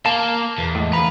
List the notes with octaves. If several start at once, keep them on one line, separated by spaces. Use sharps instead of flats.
A#3 A5
E2
A2 G#3
D2 F3 B4 A#5